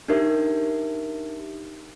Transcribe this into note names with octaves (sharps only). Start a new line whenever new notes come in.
D4 D#4 G4 A#4 E5